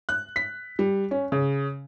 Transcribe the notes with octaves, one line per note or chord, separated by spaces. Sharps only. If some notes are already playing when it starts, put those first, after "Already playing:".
F#6
B6
G3
C#4
C#3